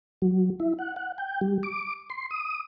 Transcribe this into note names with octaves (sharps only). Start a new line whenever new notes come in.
F#3
E4
F#5
F#5
G5
G3
D6
C6
D#6